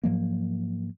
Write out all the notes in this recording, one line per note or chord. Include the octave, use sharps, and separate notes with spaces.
G#2 F3 F#3 A#3